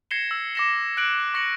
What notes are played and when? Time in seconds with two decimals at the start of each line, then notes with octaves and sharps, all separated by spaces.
0.11 G#6 A#6 C7 C#7 E7 G7
0.31 E6
0.55 D6 A#6 E7
0.97 F#6 D7 F#7
1.34 C#6 A#6 C#7 F#7